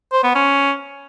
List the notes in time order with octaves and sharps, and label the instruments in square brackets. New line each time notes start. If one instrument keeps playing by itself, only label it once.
[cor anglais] C5
B3
C#4